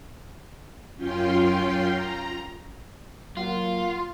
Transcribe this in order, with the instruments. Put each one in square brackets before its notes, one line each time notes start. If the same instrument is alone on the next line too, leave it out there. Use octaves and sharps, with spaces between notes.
[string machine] F#2 C#4 F4 G5 C6
A#5
[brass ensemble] F#3 A#3 F#5 [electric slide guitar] F4